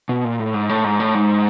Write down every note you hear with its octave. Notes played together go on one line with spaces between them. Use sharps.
B2
A#2
A2
G#2
A2
G#2
A2
G#2